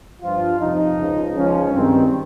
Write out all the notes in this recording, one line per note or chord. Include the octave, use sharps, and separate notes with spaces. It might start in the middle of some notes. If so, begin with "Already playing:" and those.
G2 F3 F4
F2 C3 F3 D#4
C#2 C#3 F3
C#2 C#3 F3 C#4
G2 D#3 C4